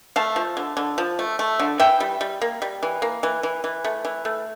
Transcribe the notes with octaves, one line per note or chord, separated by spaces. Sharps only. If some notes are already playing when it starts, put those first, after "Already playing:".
A3 F5 A5
F3
D3
D3
F3
A3
A3
D3
E3 E5 G5
G3
G3
A#3
G3
E3
A#3
E3
E3
E3
A3
E3
A3